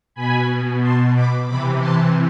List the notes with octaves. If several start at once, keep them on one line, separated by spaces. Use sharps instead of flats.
B2 G#5 B5
A5 C6
B5 D6
C3 E3 B5 D6
A5 C6